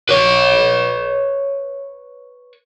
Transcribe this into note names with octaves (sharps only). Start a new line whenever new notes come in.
B4 C#5